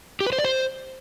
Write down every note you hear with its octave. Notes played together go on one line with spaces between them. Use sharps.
G4
B4
C5
D5
C5